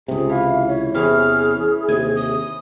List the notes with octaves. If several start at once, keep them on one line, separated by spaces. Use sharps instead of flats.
C#2 C3 G#4
E3 F5
C#5
E2 C3 E3 C#4 G#4 F6
D#2 C3 G#6
D#6